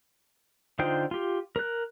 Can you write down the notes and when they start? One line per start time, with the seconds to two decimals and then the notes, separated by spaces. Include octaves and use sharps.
0.79 D3 D#4 F4 C5 G5
1.11 F4 G4
1.56 A#4 F#6